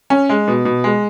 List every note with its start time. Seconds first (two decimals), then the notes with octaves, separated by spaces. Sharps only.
0.10 C#4
0.29 G#3
0.48 B2
0.65 B2
0.84 G#3